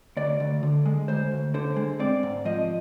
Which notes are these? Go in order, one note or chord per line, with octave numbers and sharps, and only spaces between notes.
D2 D5
D2
D3
G#3
D2 C5
D2
D3 C5
G#3
C4 D5
G#2
F3 D#5